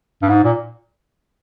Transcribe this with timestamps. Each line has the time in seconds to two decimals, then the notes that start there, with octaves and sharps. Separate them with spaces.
0.22 G2
0.29 G#2
0.44 A#2